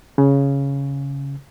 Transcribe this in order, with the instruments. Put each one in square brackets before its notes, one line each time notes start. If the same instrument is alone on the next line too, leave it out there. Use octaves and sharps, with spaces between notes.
[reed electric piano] C#3